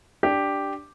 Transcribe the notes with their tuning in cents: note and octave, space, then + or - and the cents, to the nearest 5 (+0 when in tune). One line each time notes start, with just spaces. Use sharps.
D4 +0 G4 +0